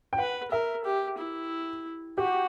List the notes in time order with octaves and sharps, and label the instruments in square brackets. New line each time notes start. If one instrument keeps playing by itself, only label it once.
[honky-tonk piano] G5
[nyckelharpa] B4 [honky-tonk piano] F#5
[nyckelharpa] A#4 [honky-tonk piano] E5
[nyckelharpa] G4
E4
[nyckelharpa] F#4 [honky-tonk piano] G4